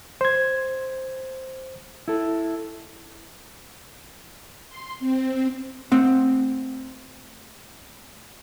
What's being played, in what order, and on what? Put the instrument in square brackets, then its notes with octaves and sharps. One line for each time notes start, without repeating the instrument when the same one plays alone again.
[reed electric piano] C5 G#6
[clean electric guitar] E4 A4
[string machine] C6
C4
[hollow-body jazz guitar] A3 C4 F#5